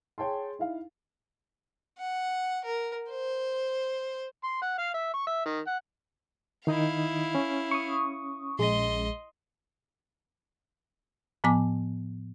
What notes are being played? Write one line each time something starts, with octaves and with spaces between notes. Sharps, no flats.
G#4 C#5 G5 A5 C6
D#4 E4 F5
F#5
A#4
C5
C6
F#5
F5
E5
C#6
E5
D#3
F#5
D#3 D#4 E4 D#5 F5
C#4
C#6 D#6
A#1 G#3 D#5 C6
A2 F3 B3 G#5 D6